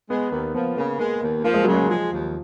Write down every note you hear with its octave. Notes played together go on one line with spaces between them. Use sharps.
G#3 B3
D#2 A#3
F3 B3
C#3 A#3
G#3 A#3
D#2
F3 A#3
G#3
C#3 F#3
G#3
F3 G#3
D#2